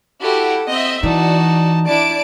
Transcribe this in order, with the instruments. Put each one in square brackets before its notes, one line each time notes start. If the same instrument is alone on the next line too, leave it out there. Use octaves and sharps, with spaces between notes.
[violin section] E4 F#4 G4 [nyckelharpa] A4 F#5
[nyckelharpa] C4 [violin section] D#5 E5
[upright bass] E3 [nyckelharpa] D#4 A5 [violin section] F#4 D5
[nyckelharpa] D4 E4 [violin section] D5 A5 D7